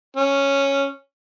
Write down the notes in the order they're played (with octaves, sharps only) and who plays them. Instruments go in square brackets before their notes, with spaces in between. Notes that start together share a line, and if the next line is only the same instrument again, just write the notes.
[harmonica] C#4